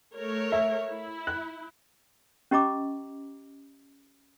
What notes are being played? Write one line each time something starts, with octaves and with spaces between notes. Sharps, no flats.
A3 A#4 C#5
E5
E4
F#6
C#4 G4 D#5 A#5 D6